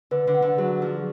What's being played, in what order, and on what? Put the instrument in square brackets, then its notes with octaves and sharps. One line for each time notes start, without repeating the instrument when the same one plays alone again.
[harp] D3 [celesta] B4
[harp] D3
[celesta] F#5
[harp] D3
[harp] F#3 [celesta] G#4
[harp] F3 [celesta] G#4